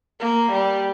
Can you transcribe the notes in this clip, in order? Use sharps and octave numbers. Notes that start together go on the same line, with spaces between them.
A#3
G3